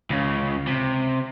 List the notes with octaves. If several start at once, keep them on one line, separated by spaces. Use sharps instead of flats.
C#2 C#3
C3